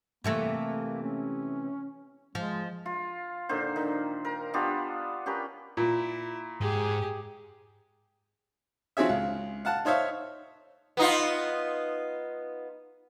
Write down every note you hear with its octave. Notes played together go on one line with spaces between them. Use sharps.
C3 E3 A3 A#3
C#4
F3 G#3
F4
A#2 D3 D#3 C5
D#3
A#4
B3 D4 F4 G4
C#4 G4 A#4 B4
A#2 E4
G#2 G4 G#4
F3 C4 F#4 G#4 C#5 E5
C#2
F5 F#5 A5
D#4 C5 C#5 E5 F5
B3 D#4 F4